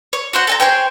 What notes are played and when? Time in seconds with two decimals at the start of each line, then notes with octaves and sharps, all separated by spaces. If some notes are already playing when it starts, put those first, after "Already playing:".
0.13 C#5
0.33 F#4 C5 F#5
0.47 A4 G#5 A#5
0.60 G#4 C5 C#5 G5